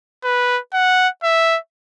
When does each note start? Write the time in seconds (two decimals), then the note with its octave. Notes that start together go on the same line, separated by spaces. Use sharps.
0.24 B4
0.74 F#5
1.23 E5